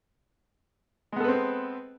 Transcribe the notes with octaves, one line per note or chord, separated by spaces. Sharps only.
G#3 B3 C4 A4 B4